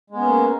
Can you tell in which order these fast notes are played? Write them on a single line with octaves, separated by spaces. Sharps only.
G#3 B3 C#4 A#3